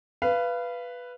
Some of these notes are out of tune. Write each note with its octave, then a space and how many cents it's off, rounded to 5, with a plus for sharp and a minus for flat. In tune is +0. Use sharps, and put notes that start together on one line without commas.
B4 +0 F5 -25